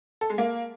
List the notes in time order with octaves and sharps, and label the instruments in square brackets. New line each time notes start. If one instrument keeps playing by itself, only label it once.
[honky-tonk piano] A4
G#3
A#3